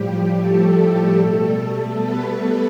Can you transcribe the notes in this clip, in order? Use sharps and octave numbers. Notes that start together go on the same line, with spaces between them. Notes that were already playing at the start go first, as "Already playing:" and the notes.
Already playing: A2 F3 G3 G4
A3 A4
B2 G3
B3 B4